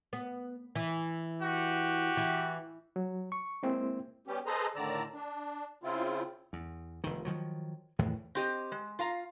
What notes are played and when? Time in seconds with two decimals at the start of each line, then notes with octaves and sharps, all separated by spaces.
0.13 B3
0.75 E3
1.42 F#4 G4
2.17 E3
2.96 F#3
3.32 C#6
3.63 G#3 A#3 C4 E4
4.27 G3 B3 C#4 G4
4.46 G#4 A4 B4 C5 D#5 A#5
4.76 A2 D3 D#3 D5 A#5 E6
5.14 D4
5.83 C#3 C4 E4 F4
6.53 E2
7.04 F1 D#3
7.25 D#3 F3 F#3
7.99 E2 A2 D#3 E3
8.35 C4 G4 D#5
8.72 G#3
8.99 F4 F5 A#5